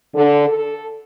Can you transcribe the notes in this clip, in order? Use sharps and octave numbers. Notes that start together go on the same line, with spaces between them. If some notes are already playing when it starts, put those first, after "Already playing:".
D3
A4